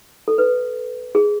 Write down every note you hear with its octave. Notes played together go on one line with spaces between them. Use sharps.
A4
B4
G#4